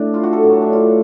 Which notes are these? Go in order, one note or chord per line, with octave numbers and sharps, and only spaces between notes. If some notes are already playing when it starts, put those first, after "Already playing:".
Already playing: A2 A3 D4
F4
F#4
A4
A2 F#3 A3
D4
F4